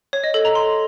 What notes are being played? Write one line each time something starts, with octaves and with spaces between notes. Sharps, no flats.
C#5
D#5
A4
A#5
C6